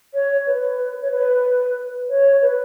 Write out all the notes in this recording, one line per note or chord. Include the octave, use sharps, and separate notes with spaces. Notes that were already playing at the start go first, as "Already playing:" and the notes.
C#5
B4
C#5
B4
C#5
B4